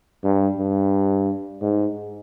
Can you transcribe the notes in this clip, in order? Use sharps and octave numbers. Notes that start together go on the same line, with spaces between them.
G2
G2
G#2